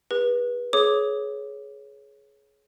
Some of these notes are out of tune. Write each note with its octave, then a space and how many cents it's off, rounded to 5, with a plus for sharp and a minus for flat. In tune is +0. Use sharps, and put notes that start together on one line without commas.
G4 +45 B4 -25
G#4 +25 C#5 +0 D6 +0